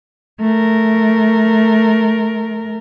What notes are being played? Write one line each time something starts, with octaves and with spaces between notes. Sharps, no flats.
A3 A#4